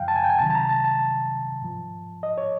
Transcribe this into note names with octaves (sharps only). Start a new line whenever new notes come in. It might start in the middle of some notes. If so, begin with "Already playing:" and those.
Already playing: F#2 C#3 F3 F5 G5
A5
G#5
G5
G#5
C#2 C3 D#3 F#3 A5
A5
A#5
A5
A5
G#2 F3
D#5
C#5